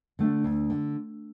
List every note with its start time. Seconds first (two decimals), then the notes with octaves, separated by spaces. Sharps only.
0.19 D3 A3 D4
0.44 D2
0.70 D3